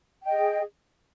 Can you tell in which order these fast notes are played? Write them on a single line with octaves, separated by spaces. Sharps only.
G5 D#5 G#4